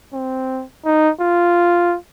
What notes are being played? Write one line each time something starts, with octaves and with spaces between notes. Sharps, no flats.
C4
D#4
F4